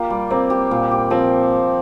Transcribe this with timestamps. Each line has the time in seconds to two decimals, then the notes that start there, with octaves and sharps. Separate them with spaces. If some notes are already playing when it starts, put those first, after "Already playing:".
Already playing: A#3 F4 G4
0.10 G3
0.30 A#3 C4
0.50 G4
0.71 A#2
0.91 G4
1.10 F3 C4